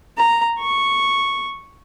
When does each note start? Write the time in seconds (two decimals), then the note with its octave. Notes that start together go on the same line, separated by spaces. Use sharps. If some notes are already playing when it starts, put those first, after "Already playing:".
0.17 A#5
0.59 C#6